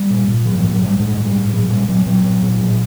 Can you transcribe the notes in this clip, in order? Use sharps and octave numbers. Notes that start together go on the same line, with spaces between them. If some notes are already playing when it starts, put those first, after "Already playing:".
Already playing: G3
A#2
A#2
A2 F#3
F3
A2
F#3
A2 G3
A2 G#3
A2
G3
A2
A#2 F#3
A#2 G3
A#2 F#3
A#2 F#3
A#2
A#2
A2